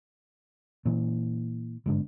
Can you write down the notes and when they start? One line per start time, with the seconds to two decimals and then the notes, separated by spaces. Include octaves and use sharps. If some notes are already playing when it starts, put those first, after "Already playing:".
0.85 A#2 E3
1.86 G1 G#2 D3